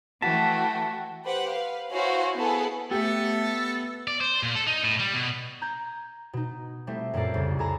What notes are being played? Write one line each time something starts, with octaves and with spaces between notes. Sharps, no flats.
E3 A3 F#4 G5 A5 B6
G4 B4 C5 F#5
B4 F5
E4 F#4 C5 C#5 F5 G#5
B3 E4 G#4 A4 B4
A3 B3 G4 A4
D5
C5
A#2
A4
D#4
A2
G3
B2
A#5 G6 G#6
B2 D#4
G3 A3 C4 E4 E5
F#2 A#2 G3 A4 D5 C7
C2 F2 C#3
G#4 A4 G#5 A#5 B5